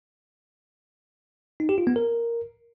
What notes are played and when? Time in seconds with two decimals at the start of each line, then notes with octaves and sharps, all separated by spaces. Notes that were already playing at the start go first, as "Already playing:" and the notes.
1.60 D#4
1.69 G4
1.78 F4
1.87 B3
1.96 A#4